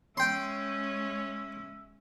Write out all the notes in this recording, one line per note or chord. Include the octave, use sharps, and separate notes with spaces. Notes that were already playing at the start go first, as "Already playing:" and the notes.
G#3 C#4 C#5 E5 G5 C6